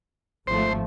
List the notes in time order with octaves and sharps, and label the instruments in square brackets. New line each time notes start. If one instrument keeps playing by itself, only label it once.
[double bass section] G#1 F3 A3 [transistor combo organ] C5